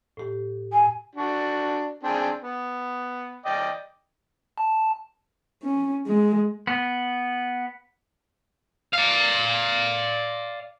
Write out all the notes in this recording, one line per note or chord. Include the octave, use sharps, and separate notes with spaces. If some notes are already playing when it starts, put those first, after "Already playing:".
A2 G4
G#5
D4 F#4
C4 D4 G#4
B3
D5 D#5 G5
A5
C#4
G#3
B3
D5 F5